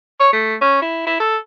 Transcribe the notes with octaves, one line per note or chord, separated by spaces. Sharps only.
C#5
A3
C#4
E4
E4
A4